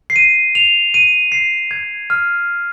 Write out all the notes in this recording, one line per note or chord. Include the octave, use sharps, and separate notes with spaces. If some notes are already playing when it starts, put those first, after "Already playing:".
C7
D#7
F7
D#7
C7
G#6
F6